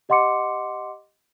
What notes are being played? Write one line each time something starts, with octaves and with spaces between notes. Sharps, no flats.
G4 D#5 F#5 C6 D6 C#7